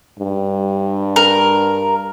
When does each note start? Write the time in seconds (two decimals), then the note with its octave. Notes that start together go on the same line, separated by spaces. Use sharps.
0.20 G2
1.16 A#4